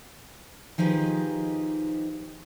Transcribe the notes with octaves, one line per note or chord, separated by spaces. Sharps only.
D#3 F3 D#4 G4 G#4 B4